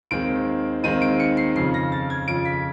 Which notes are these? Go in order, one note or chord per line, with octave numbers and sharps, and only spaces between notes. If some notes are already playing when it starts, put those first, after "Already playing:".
D#2 D#3 G#3 C4 D7
D#2 D#3 G#3 C4 D#7
D7
C#7
C7
F2 C#3 F3 C7
A#6
A6
G#6
F2 C#3 F3 D7
B6